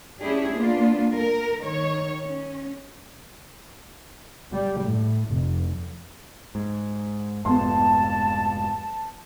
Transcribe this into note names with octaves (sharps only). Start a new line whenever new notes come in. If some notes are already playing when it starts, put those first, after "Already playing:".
C#4 D4 E4 G4 G#4
A#3 B3 D4 F4
A#4
D#3 C#5
C#4
G3
A2
F1
G#2
F1 F2 G#2 B3 A5 C6